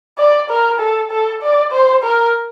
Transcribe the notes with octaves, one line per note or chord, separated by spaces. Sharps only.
D5
A#4
A4
A4
D5
C5
A#4